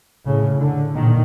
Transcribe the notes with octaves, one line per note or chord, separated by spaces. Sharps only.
A2 C#3
D3
A#2 D#3